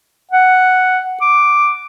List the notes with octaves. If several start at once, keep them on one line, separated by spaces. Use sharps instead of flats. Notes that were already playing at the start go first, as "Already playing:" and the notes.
F#5
D6